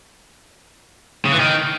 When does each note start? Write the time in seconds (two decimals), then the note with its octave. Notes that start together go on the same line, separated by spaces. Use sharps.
1.25 C#3
1.32 E3
1.40 D#3